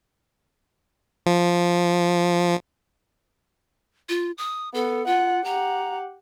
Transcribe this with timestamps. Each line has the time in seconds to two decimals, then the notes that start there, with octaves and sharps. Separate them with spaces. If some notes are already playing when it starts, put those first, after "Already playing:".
1.26 F3
4.09 F4
4.38 D#6
4.74 B3 A4
5.06 F4 F#5
5.44 G4 F#5 A#5